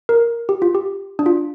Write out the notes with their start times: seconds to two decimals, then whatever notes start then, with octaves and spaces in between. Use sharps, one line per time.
0.09 A#4
0.49 G4
0.62 F4
0.75 G4
1.19 D4
1.26 F4